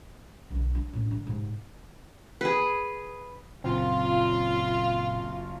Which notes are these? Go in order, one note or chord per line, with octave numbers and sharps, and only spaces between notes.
B1 D3
D4
A2 C#4
D3
G#2 C3
G#4 B4
F#1 A#2 C4 F4